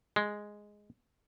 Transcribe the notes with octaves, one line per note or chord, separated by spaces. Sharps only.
G#3